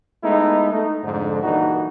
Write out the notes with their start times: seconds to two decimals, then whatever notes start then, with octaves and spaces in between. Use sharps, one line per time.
0.23 G#3 A3 B3 D#4 E4
0.72 A3 D#4
1.04 F2 G#2 D3
1.42 G2 A#2 E3 D#4 F#4